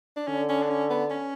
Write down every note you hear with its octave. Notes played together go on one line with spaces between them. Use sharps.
D4
D3 C#4
C#4
D4
C#4
B3
C#4